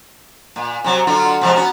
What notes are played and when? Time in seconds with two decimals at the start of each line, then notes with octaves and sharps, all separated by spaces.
0.56 A#2
0.84 C3 F#3
1.07 D3 F#3 F4
1.41 C3 F3 G#3
1.55 B3 C#4 F#4